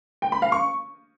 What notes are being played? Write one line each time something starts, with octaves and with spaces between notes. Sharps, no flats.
G5
B5
F5
C#6